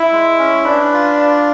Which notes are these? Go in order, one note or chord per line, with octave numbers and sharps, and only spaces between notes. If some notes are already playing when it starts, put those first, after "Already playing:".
Already playing: E4
G#3
C#4
D4 B4
F4
F4